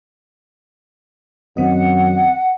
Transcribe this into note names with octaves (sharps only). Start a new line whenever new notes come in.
F#2 D#3 C4 D#5 F#5